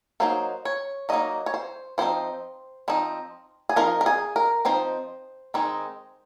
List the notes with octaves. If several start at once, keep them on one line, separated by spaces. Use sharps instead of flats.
F#3 A#3 D#4 C5
C#5
F#3 A#3 D#4 D#5
C#5
C5
F3 C4 D#4 C5
F3 C4 D#4
G#4
F3 C4 D#4 A#4
A#4
G#4
A#4
F3 C4 D#4 C5
D#3 G#3 C4 D#4